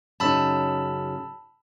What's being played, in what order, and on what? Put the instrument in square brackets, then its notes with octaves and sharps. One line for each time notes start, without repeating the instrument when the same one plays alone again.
[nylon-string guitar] F#2 C#3 D#4 [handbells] A5 B5 E6